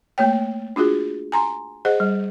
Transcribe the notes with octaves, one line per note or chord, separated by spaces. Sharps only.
A3 A#3 C#5 G5
D4 F4 F#4 G#4
G#5 A#5 C6
G#4 C5 D#5 F#5
G3